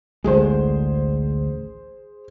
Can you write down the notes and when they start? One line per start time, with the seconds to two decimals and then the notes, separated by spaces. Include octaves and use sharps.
0.24 A1 D2 G#3 G#4 C5